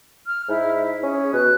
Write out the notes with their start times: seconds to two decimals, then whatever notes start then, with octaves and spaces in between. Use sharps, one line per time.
0.27 F6
0.49 G#2 E4
1.03 C#4 G#4
1.33 B2 F#6